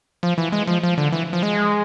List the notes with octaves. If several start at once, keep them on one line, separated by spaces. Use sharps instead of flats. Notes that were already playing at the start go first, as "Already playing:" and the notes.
F3
E3
G#3
F3
F3
D3
E3
F3
G#3